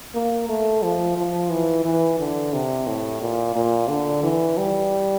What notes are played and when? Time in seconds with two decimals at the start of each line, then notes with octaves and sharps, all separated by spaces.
0.15 A#3
0.49 A3
0.83 F3
1.17 F3
1.50 E3
1.85 E3
2.19 D3
2.53 C3
2.87 A2
3.22 A#2
3.56 A#2
3.89 D3
4.23 E3
4.58 G3